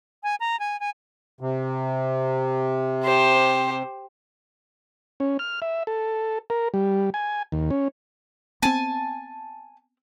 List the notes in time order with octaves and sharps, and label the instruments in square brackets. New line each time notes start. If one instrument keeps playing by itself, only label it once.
[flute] G#5
A#5
G#5
G#5
[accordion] C3
[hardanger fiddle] G4 C5
[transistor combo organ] C#4
F6
E5
A4
A#4
G3
G#5
D#2
C#4
[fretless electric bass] B3 C4 [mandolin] G#5 A5